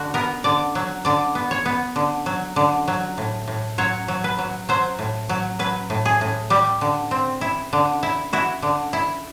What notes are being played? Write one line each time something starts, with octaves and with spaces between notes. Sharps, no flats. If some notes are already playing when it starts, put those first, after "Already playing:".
Already playing: D3 F#4
B3 A#4
D3 D5
F#3
D3 D5
B3
C#5
B3
D3
F#3
D3
F#3
A2
A2
F#3 C#5
F#3
B4
F#3
F#3 C5
A2
F#3
F#3 B4
A2
G#4
A2
G3 G4
D3
C4
E4
D3
E4
E4 F#4
D3
E4